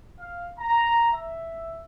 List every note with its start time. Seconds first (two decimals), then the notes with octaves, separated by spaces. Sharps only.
0.19 F5
0.59 A#5
1.11 E5